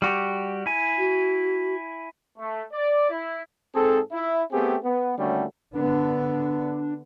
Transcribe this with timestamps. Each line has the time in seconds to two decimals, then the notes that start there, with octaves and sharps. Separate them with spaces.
0.02 G3 F#4 G4
0.66 E4 G#5
0.97 F#4
2.38 A3
2.73 D5
3.10 E4
3.74 G#2 C4 G#4 A4
4.12 E4
4.52 A3 B3 C4 G4 G#4
4.83 B3
5.18 D#2 D3 G3 A3 C#4 F#4
5.75 D3 B3 D4